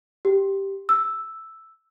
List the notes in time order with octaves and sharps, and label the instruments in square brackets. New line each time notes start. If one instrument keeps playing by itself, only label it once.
[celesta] G4
E6